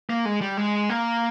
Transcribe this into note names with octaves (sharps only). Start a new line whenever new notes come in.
A#3
G#3
G3
G#3
A#3